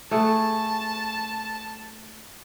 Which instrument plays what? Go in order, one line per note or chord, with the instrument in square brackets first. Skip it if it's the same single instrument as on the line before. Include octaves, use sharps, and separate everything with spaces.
[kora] A3 G#4 F#5 [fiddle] A5